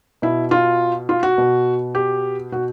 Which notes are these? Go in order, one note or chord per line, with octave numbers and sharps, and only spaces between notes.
B2 E4
F4
F4
F#4
B2
G4
B2 F#4